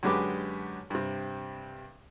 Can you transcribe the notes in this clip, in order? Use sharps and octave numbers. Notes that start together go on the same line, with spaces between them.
F#2 D3 G#3 G4 B4 D6
G2 C3